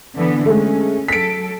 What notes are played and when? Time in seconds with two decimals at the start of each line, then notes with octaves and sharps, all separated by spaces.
0.16 D3 E3 B3
0.46 G#3 A3 C#4
1.08 F#3 A4 B6 D7